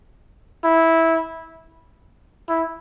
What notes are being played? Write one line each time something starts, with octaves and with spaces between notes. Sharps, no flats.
E4
E4